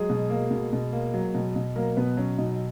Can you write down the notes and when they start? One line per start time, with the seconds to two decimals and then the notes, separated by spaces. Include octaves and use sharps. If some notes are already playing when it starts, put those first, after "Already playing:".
Already playing: F#3 G#3 G#4
0.10 B2
0.30 A#3
0.51 B2
0.73 B2
0.92 A#3
1.14 F#3
1.35 B2
1.56 B2
1.76 F#3 A#3 A#4
1.97 B2 B3 B4
2.17 F#3 C#4
2.38 B2 D#4